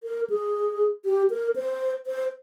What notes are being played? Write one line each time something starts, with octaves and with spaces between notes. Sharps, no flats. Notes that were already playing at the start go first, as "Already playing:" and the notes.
A#4
G#4
G4
A#4
C5
C5